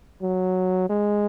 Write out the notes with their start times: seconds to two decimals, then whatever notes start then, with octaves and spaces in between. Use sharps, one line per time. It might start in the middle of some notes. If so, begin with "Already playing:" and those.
0.22 F#3
0.89 G#3